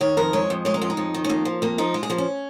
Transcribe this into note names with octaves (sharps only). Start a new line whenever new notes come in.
D#3 C#5
F2 A#4
G#3 C#5
F2
G#3 C#5
A#4
F2 F4
D#4
F2
D#3
C#4
F2 A#3
F3
F2 A#3
F3 D#4
G#3 F4
G#4
F3 A#3
C#4